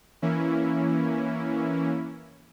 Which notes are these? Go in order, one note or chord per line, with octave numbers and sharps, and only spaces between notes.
E3 A#3 C#4 E4